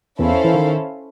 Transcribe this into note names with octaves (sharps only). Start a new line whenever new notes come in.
E2 E3 C#4 E4 A4 C5 F5
E3
D#3